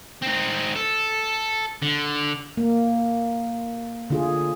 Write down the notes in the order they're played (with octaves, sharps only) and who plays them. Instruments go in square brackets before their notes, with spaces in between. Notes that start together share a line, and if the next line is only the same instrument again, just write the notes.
[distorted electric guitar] C4 D#4
A4
D3
[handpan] A#3
D3 F4 G#4